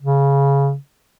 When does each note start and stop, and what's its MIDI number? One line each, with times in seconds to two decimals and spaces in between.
0.02 0.75 49